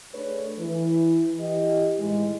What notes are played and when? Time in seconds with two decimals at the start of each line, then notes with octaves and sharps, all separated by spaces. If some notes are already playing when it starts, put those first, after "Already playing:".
0.14 A3 D4 G#4 A4 B4 C#5
0.59 E3
1.39 E3 G4 D#5
1.98 A2 D#3 E3 G#3